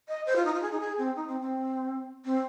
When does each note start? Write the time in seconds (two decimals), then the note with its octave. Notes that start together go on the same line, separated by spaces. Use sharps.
0.08 D#5
0.26 C5
0.36 F4
0.45 D#4
0.54 F4
0.62 G#4
0.72 D#4
0.80 G#4
0.98 C4
1.16 D#4
1.28 C4
1.40 C4
2.25 C4